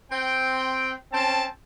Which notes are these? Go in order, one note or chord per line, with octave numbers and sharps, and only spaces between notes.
C4 G5
C4 C#4 A5